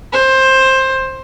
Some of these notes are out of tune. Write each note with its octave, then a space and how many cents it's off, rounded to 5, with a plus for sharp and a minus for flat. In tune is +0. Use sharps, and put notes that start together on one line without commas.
C5 +15